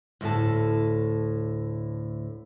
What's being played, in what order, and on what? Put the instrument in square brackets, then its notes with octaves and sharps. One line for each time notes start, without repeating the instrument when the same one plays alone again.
[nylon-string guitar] D2 A2 A5